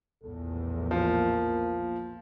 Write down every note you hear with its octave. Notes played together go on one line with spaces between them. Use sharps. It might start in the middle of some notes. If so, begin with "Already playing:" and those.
A#1 E2 A2 A4
F3 A#3